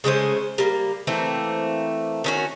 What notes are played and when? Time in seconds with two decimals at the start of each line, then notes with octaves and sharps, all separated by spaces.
0.04 C#3 G#3 A3 C5
0.58 G3 A#3
1.07 E3 A3 A#3 C4
2.24 D#3 C#4 F#4